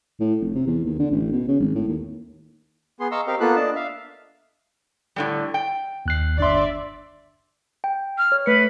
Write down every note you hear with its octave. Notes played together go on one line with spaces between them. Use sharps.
A2
F1
C3
E2
D#2
D3
A1
B2
C#3
G#1
A2
D#2
B3 G#4 C6
D#5 F5 A#5 C6 C#6 E6
C4 G4 A#4 D#5 F5
A#3 B3 F4 A4 F#6
D4 D#5 A5
E5 F5
A2 D3 G3
G5
D#2 F#6 C7
G1 D4 D5 E5 C6
G5
F6
C#5
A3 B4 C#7